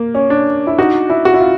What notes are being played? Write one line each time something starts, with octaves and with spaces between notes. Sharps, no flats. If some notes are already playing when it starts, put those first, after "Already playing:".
Already playing: A#3
C#4
D4
E4
D#4 F#4
E4
F#4
E4
F4